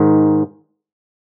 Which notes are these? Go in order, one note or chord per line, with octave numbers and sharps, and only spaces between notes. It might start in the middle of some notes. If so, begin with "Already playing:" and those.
Already playing: G#2 D#3